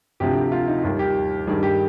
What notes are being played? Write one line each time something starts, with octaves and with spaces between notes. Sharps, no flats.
D2 C3 F3 G4
F4
D#4
D#2 D#3 G3 F4
G4
G2 D#3 G3 G#4
G4